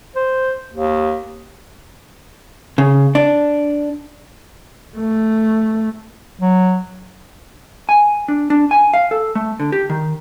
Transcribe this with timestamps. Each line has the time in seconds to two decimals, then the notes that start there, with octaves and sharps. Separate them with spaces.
0.16 C5
0.73 D#2
2.78 C#3
3.15 D4
4.97 A3
6.39 F#3
7.89 G#5
8.28 D4
8.50 D4
8.71 G#5
8.94 F5
9.11 A4
9.35 A3
9.60 D3
9.72 G4
9.90 D#3